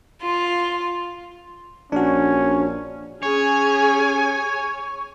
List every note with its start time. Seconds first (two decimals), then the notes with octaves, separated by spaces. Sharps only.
0.23 F4
1.92 A#1 C#4 D4 F#4
3.23 C#4 G#4 C#5 G#5